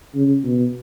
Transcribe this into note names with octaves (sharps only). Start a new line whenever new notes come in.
C#3
B2